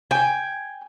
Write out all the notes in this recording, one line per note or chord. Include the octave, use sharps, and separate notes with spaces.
G5 G#5